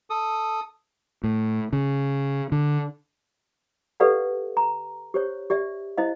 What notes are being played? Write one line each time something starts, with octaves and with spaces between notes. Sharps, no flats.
A4 D#6
A2
C#3
D3
G4 A4 B4 D5 F5 F#5
A#5
G4 C5 C#5
G4 D5 E5
E4 C5 D#5 F5